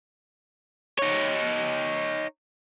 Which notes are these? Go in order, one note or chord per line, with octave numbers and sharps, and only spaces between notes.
D#4 C#5